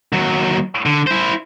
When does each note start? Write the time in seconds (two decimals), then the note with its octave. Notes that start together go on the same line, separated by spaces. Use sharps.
0.13 D#2 F#3
0.86 D3
1.07 E4 C5